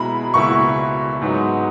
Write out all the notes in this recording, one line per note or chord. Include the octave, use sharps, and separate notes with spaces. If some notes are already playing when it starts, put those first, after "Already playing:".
Already playing: B2 G#3 E4 A#5 B5
C#2 B2 A#3 E4 C#6
G#2 F#3 B3 D#4 F#4